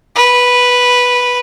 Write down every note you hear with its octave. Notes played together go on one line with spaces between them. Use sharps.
B4